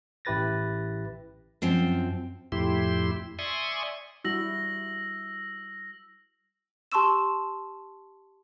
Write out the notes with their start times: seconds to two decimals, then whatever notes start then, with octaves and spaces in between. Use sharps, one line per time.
0.25 A1 E4 G4 B4 A6 A#6
1.62 F#2 F3 C4
2.52 F2 A2 E4 G4 C6
3.39 D5 E5 G#5 C6 C#6 D#6
4.25 G3 E4 F#4 E6 A#6 F#7
6.92 G4 A5 C6 C#6 E6 E7